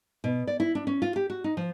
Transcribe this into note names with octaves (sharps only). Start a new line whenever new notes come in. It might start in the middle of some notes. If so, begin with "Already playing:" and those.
B2
D5
E4
D4
C#4
F4
G4
F#4
D#4
F3